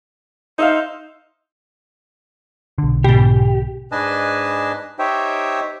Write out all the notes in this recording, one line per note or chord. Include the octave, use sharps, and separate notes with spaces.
D#4 C5 E5 F5
B1 D3
G#2 B2 G4
G#2 D4 B4 D#5 G#5 A5
D#4 G4 C5 C#5 E5 G5